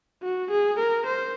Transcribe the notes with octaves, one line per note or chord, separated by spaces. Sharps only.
F#4
G#4
A#4
C5